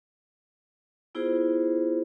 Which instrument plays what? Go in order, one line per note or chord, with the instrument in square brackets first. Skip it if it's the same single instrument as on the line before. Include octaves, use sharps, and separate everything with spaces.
[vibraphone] B3 E4 F4 G#4 C5